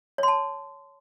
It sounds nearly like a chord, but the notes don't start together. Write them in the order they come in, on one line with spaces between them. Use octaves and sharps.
C#5 C6 A5